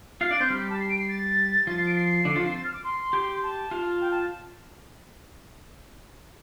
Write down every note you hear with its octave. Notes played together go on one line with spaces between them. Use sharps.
F4 F5 C7
D4 D5 A6
C4 C5 G6
G3 G4 F6
D6
A5
C7
D7
C7
A6
F3 F4 A6
C7
D7
C7
D3 D4
F3 F4
C4 C5
A6
F6
D6
C6
G4 G5
C6
A5
F4 F5
G5
A5